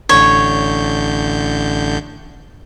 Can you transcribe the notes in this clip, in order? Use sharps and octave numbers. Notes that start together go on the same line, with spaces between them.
A1 D3 C#5 G6